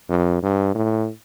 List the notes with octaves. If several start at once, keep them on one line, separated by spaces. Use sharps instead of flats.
F2
G2
A2